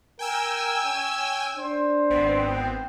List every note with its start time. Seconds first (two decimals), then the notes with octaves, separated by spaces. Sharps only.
0.19 A#4 G5 G#5 E6
0.84 C#4
1.58 D4 C5
2.10 G#1 B3 C4
2.54 G5